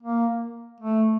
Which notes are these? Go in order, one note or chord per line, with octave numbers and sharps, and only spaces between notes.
A#3
A3